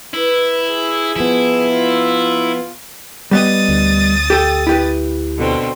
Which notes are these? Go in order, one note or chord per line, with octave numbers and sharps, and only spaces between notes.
E4 B4
G#4
F3 B3 E4
F4
G3 B3 D#5 D#6 A6
D2
G4 A4 G5
E4 G4 B4
B2 D3 C4